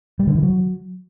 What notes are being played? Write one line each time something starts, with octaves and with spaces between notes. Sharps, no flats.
G3
D3
E3
F#3